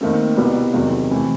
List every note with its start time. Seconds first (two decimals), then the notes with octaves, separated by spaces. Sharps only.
0.01 D#2 D#3 A3 C4
0.37 C2 B2 G3 B3 F#4
0.73 E2 C3 D#3 F#3
1.11 C3 E3 A3